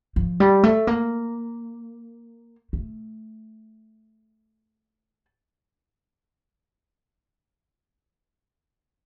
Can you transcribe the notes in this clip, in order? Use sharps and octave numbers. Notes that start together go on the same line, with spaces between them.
F3
G3
A3
A#3
A3